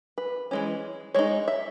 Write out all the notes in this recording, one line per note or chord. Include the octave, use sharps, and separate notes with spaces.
B4
E3 G#3 C#4
G#3 D#4 C#5
E5